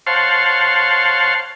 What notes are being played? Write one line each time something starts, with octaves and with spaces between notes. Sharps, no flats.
C5 C#5 F5 F#5 A5 C6